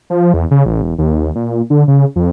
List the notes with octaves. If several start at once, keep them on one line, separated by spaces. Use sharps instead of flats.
F3
E2
C#3
A1
E1
D#2
A#2
D3
C#3
F2